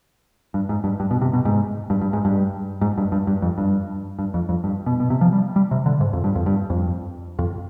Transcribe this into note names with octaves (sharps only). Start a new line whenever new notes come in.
G2
G#2
G2
G2
B2
C3
B2
G#2
G2
G2
G#2
G2
G#2
G2
G2
G2
F2
G2
G2
F2
F2
G2
B2
B2
C3
F3
G3
G3
C3
D3
G#2
F2
G2
F2
G2
F2
F2